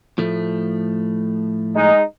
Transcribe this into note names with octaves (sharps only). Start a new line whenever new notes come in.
A2 F3 A3
G#3 D#4